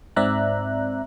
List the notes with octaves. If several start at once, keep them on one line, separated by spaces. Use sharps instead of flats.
G#2 C4 D5 E5 A#5 F#6